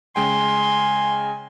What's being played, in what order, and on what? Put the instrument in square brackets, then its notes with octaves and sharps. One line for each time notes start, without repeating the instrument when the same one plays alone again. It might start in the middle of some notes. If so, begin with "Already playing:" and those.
[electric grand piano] C#3 G#3 G5 [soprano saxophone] G#5 [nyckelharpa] C6